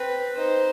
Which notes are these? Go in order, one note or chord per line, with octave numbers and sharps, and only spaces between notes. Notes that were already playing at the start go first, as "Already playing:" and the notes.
Already playing: C4 B4
D#4 C5